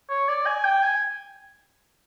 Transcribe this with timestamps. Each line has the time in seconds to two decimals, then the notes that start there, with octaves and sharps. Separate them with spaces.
0.09 C#5
0.28 D5
0.46 G#5
0.64 G5
0.83 G#5